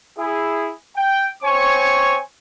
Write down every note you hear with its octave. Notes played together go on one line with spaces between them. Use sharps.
E4 G#4
G5
C4 C5 C#5 G#5 C#6